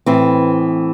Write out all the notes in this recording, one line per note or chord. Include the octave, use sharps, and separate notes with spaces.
A2 E3 C4